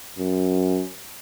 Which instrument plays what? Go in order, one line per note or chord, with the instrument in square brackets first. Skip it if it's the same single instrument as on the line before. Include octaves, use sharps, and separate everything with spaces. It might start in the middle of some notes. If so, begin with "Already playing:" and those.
[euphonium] F#2